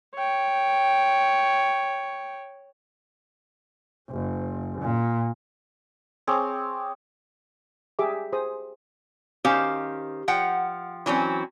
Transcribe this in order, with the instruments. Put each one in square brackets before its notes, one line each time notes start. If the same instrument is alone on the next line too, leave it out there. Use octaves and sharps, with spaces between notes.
[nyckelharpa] C#5 G5
[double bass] F#1
A#2
[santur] C4 G#4 C#5 D6
[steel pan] G4 G#4 E5 D6
G#4 C5 D#6
[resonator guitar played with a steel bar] D#3 C#4 G4 C5 F5
F3 F#5 G5
E3 F#3 C4 C#4